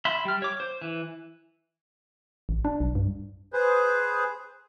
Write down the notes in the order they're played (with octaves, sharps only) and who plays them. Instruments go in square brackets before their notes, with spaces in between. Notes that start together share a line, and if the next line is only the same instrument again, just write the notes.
[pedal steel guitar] E5 B5 C6
G3 F6
C#5 D6
C5
E3
[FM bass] A1
D4
B1
G2
[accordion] G#4 B4 C5